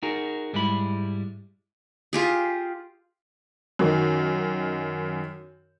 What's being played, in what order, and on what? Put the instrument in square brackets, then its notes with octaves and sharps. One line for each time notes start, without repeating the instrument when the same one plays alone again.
[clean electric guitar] D#4 F#4 G#4 A#4
G#2 G3 G#3 E4 B5
[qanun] F4 G4 G#4
[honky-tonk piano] F#2 D#3